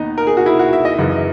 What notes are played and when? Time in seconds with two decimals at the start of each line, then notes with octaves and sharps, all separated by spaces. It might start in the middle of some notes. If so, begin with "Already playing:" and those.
Already playing: D#2 B3 D#4
0.18 A#4
0.27 G#4
0.37 F#4
0.46 E4
0.59 F#4
0.73 E5
0.85 D#5
0.98 F#2 C#3 E3